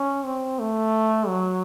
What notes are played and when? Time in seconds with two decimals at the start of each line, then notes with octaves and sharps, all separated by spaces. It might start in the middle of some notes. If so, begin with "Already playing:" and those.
Already playing: C#4
0.25 C4
0.60 A3
1.28 F#3